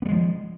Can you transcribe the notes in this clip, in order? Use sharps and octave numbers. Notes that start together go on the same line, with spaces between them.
F3 G3 G#3 B3